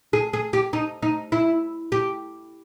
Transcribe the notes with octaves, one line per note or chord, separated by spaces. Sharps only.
G#4
G#4
G4
D#4
D#4
E4
G4